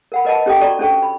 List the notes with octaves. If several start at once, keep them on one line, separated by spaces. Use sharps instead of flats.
A#4 F#5 B5
A#4 B4 D#5 F#5 A5 B5
C#4 G4 A4 G5 D#6
F#4 A4 D5 A#5 C6 C#6
C#4 D4 A4 C5 G5 C#6
B5